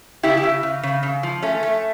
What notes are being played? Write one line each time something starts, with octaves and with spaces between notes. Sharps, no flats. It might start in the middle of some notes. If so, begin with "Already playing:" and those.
C#3 E4 G4
E4 G4
C#3
C#3
C#3
C#3
F3
A3 C#4
A3